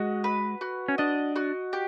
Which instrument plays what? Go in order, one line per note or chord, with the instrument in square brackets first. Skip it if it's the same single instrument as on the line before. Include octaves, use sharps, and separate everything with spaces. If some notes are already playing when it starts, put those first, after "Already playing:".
Already playing: [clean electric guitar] G#3 [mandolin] F#4 D#5
[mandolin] B4
F#4
[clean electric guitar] C#4
[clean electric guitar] D4 [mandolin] D#5
[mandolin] F#4
G4